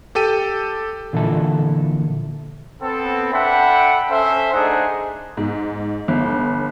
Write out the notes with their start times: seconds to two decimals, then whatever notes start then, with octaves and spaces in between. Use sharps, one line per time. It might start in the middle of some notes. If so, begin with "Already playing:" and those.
0.15 G4 A4 G5 D#7
1.13 A#2 D3 E3 F3 E4 A4
2.81 B3 C4 A4
3.32 D4 A4 E5 F#5 G5 B5
4.10 C#4 A4 C5 E5
4.52 A3 D4 D#4 G#4 C5 F#5
5.37 G#2
6.08 G1